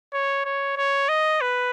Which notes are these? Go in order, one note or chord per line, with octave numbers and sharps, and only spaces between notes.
C#5
C#5
C#5
D#5
B4